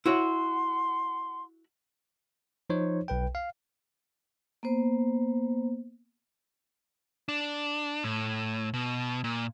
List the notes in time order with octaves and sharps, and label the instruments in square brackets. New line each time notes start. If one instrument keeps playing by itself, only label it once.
[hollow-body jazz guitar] E4 F#4 C#5 [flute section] F#5 C6
[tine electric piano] F3 D#4 C5 C#5
B1 B4 G5
F5
[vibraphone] A#3 B3 C5
[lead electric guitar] D4
A2
B2
A#2